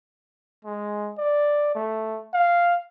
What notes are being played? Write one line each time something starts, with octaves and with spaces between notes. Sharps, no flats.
G#3
D5
A3
F5